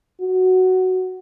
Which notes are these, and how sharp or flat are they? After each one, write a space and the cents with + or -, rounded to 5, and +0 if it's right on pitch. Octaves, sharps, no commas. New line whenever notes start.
F#4 +5